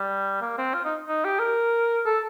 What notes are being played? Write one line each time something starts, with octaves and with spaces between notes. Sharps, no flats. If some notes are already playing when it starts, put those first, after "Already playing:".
Already playing: G3
A#3
C4
F4
D#4
D#4
G4
A#4
A4